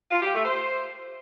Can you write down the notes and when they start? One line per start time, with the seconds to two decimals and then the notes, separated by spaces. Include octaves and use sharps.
0.11 F4
0.22 G4
0.33 A3
0.45 C5